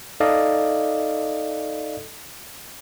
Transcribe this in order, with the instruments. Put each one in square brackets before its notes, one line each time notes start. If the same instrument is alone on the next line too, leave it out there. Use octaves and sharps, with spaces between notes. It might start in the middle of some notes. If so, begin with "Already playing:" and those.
[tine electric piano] D#4 A4 D5 D#5 F5